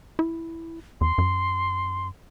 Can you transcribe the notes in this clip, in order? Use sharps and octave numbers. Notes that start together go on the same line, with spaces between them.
E4
E2 C6
F#2